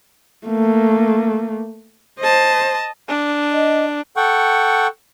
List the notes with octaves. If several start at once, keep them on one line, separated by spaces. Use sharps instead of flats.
A3 A#3
C5 D#5 A5
D4
D#5
A4 F#5 G5 C#6